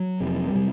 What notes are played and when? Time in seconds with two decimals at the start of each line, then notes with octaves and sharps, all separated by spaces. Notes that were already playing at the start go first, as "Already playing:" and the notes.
Already playing: F#3
0.20 F1 F2 C3
0.50 G3
0.55 C3